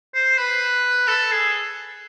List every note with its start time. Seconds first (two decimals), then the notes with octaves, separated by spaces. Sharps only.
0.15 C5
0.38 B4
1.08 A4
1.31 G#4